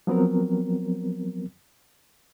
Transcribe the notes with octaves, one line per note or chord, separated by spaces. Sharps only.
F3 F#3 B3 C4 A#4